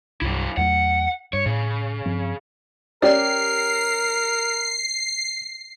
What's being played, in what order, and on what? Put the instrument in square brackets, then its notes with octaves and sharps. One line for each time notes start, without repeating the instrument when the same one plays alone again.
[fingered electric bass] C2 G2 [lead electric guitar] F#3 E4
[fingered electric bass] E2 F#3 A3 [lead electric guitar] F#5
[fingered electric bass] G2 [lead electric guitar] C#5
[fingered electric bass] A2 [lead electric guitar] C#3
[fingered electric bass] G2 F3 C4
[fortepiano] C#4 G4 [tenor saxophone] A#4 [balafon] D5 [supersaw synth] C7